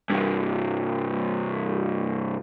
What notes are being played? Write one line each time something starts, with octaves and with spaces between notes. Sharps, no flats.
C2 G2